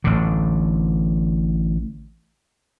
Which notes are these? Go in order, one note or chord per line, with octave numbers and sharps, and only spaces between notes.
A1 D3